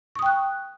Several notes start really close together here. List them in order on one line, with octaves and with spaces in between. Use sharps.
C#6 D#6 G5 F#6